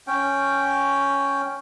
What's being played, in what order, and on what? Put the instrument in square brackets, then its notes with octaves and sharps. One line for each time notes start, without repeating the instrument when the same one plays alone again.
[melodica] C#4 G5